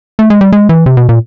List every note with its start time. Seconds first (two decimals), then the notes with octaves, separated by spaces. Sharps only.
0.19 A3
0.30 G#3
0.41 G3
0.53 G#3
0.69 E3
0.86 C3
0.97 B2
1.09 A#2